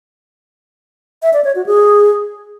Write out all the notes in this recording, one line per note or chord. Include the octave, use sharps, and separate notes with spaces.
E5
D5
C#5
F#4
G#4